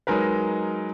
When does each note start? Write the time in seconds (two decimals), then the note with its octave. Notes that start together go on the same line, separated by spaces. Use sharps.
0.07 F#3 G#3 D#4 A#4 B4